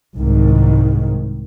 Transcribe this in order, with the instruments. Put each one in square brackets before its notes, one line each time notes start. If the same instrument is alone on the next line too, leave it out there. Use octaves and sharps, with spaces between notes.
[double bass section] C2 G#2 D#3